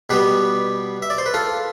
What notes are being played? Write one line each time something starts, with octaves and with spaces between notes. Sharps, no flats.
B2 G3 B3 G4 B4
E5
D5
C5
B4
F4 A4